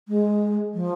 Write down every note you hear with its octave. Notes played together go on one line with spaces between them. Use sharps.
G#3
F3